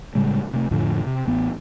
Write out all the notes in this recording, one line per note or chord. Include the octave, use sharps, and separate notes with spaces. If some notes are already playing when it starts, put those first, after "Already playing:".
A2 C#3 G3 G#3
C3 A3
F2 A2 D3 F3
C3
A1 B3